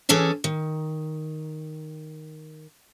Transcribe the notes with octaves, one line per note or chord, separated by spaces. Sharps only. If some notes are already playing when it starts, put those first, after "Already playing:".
E3 C#4 G#4 A4 C#5
D#3